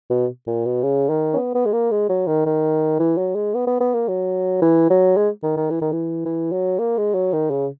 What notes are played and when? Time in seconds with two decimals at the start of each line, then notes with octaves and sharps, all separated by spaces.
0.10 B2
0.47 A#2
0.66 B2
0.83 C#3
1.10 D#3
1.34 C#4
1.37 B3
1.55 B3
1.66 G#3
1.73 A#3
1.91 G#3
2.09 F#3
2.27 D#3
2.46 D#3
3.00 E3
3.18 F#3
3.35 G#3
3.54 B3
3.67 B3
3.80 B3
3.94 A#3
4.08 F#3
4.62 E3
4.90 F#3
5.17 G#3
5.43 D#3
5.57 D#3
5.70 E3
5.82 D#3
5.92 E3
6.25 E3
6.52 F#3
6.79 A#3
6.98 G#3
7.14 F#3
7.33 D#3
7.50 C#3